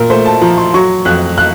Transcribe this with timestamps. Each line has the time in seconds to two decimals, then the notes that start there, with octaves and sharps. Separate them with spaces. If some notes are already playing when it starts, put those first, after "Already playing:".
Already playing: A#2 A#4
0.10 A3 C5
0.26 A5
0.41 F3 A#5
0.58 C6
0.74 F#3 C#6
1.05 F2 F#6
1.38 F#6